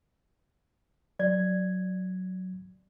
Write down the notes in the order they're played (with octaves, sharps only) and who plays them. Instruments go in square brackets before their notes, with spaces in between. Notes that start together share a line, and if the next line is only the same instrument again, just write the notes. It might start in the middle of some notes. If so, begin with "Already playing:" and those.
[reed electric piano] F#3 G#6 [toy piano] D5